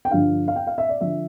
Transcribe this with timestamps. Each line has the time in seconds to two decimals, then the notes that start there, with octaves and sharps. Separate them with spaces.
0.05 G5
0.11 G2 D3 F3 F5
0.48 F5
0.56 G5
0.67 F5
0.78 E5
0.89 D5
1.01 D3 F3 E5